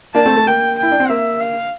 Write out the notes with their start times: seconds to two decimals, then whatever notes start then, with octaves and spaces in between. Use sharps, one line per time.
0.14 A#3 D4 A5
0.26 A3 C4
0.37 A3
0.47 A#3 G5
0.77 G5
0.83 E4
0.91 D4
1.00 C4
1.09 A#3 E5
1.41 F5